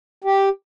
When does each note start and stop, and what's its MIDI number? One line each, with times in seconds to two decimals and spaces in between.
0.24 0.49 67